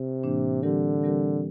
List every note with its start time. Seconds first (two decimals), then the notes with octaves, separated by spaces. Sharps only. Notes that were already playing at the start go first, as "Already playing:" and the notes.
Already playing: C3
0.23 A2 E3 A#3 D4
0.63 D3 E3 G3 C4 G4 A#4
1.02 E3 G3 C4 G4 A#4